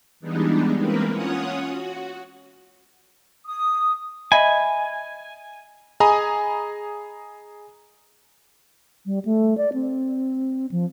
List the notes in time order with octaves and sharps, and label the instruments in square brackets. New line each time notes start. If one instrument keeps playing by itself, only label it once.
[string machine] E3 G3 G#3 B3 D4 D#4
E3 G#3 A#3 C4 A#4 B4
C#4 F4 C#5 F#5 D#6
F#4
[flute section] D#6
[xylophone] D#5 E5 B5 [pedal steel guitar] G#5
[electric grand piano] G#4 D#5 G#5 A#5 B5 D#6
[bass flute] G3
A3
D5
C4
F3